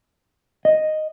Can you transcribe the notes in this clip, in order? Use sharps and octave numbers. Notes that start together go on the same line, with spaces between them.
D#5